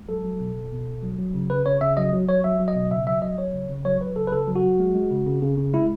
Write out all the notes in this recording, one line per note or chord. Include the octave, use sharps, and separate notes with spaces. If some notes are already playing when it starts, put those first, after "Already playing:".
Already playing: G#3
F#3 A4
F#3
B2
B2
B2
B2
F#3
F#3
C#3
C#3 B4
C#3 C#5
C#3 E5
F#3 D#5
F#3
F#3 C#5
F#3 E5
F#3
D#5
B2
C#3 E5
F#3 E5
F#3 D#5
F#3 C#5
C#3
C#3
F#3 C#5
F#3 B4
C#3 A4
B4
C#3 A4
F#3
F#4
F#3
G#3
G#3
C#3
C#3
C#3
C#3
G#3 E4